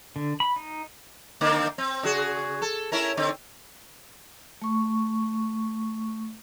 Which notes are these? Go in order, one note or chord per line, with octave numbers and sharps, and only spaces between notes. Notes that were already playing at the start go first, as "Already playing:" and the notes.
D3
B5
D#4
D3 A#3 C4
C4
C#3 F#4 G#4
A4
C#4 E4 A#4
D3 C4
A3 C#6